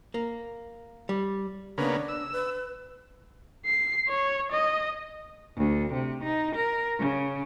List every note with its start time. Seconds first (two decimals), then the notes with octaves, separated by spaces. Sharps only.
0.14 A#3
1.09 G3
1.78 C#3 A#3 B3 D4
2.08 E6
2.32 B4
3.66 C7
4.08 C#5
4.52 D#5
5.56 D2
5.93 C3
6.23 D#4
6.56 A#4
7.00 C#3